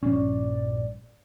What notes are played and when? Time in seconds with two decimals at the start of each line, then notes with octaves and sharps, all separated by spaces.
0.03 A#1 G2 F3 C#4 D5